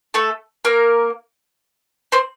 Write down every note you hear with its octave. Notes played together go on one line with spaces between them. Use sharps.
A3 A4
A#3 A#4
C4 C5